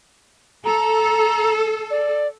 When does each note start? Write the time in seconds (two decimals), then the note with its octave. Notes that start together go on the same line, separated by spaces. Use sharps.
0.65 A4 A#5
1.90 D5